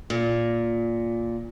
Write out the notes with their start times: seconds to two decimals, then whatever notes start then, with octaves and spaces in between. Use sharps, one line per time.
0.10 A#2